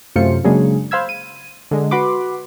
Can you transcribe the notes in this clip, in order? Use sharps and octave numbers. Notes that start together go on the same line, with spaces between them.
F#2 C3 A3 F4 C5 C#7
C#3 F#3 G#3 A#3 D4 G#4
C5 F5 B5 E6 G#6
D#7
D3 G#3
F#4 B4 F#5 B5 C6 D6